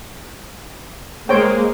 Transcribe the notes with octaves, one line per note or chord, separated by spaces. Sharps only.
G#3 A#3 C5 C#5 G5